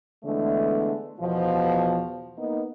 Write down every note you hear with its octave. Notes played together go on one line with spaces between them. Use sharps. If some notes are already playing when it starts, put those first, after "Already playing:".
D3 E3 G#3 A3 B3
E2 B2 F3
A#3 B3 D#4